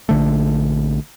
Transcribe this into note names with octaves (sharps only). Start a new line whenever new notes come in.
A#1 D3 A3